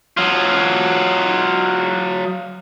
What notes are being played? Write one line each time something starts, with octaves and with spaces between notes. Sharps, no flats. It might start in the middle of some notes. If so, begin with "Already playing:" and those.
F#3 F4